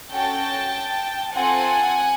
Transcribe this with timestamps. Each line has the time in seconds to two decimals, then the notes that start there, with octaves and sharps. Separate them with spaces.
0.10 C#4 F#4 A4 G5 A5
1.33 C4 F4 A4 F#5 G#5